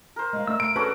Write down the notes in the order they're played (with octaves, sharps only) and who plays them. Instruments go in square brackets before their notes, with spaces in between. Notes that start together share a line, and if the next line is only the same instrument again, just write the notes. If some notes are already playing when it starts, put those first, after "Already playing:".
[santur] A#4 C5
[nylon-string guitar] G#3 F5
[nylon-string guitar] A3 D4 [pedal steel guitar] E6
[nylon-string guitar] A3 [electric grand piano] D7
[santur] C#4 D4 F#4 [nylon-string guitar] G#4 [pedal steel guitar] A4 B4